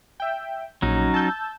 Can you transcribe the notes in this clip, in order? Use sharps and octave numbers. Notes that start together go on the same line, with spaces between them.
E5 G5
A#1 F#3 C#4 D#4
A5 E6 G6